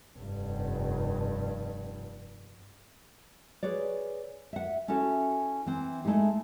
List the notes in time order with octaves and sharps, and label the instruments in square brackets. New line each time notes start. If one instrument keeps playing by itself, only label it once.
[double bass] F1 G2
[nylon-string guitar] G#4 B4 C#5 D5
E5 F#5
C#4 E4 F#4 A4
E3 C4
G#3 A3 D#4 E4 G#4